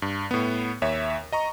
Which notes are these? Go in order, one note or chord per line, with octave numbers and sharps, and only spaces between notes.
G2
A2 B3
D#2 C#5 E5
D#5 A#5 C#6